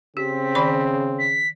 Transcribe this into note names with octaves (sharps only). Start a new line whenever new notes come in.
C#3 C4 G4 B6
D#3 D5 B5
B6